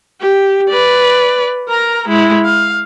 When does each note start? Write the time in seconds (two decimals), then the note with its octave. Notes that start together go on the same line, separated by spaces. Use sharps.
0.21 G4
0.70 B4 D5
1.69 A#4 A#5
2.08 G#3 E4
2.45 F5